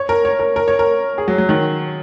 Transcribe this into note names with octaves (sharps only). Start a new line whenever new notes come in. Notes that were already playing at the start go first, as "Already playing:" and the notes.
Already playing: C#5
A#4
C#5
A#4
A#4
C#5
A#4
G#4
F#3
F#3
D#3